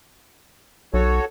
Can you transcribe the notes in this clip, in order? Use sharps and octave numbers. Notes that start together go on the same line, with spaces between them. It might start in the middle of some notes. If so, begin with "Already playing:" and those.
B1 F#4 A4 C#5